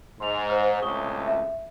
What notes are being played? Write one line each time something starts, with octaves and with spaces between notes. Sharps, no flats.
G#2 C6 F7
C5 A#5 F6
C#2 A2 C3 C#6 D#6 G7
E5